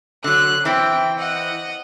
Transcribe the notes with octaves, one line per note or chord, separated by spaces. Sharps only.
D3 F#3 F#6
E3 C4 E4 G5
D#5 F#5